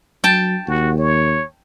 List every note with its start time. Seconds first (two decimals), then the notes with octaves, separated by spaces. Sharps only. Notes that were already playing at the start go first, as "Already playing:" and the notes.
0.24 F#3 G5 A5
0.68 D#2 F#4
0.98 C#5